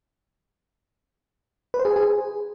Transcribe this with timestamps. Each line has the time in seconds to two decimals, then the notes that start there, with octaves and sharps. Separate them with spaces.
1.74 B4
1.80 C5
1.85 G#4
1.91 G#5
1.96 G#4